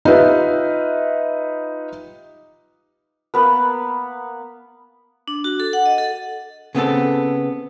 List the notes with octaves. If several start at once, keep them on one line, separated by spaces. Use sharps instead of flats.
D#4 F4 G4 B4 E5
A#3 B3 B4
D4
F#4
A4
F#5
D#5
A4
C#3 B3 C4 A4